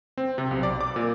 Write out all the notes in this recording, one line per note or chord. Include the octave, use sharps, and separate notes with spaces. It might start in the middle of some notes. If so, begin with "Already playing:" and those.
C4
C3
B1
D5
D6
A#2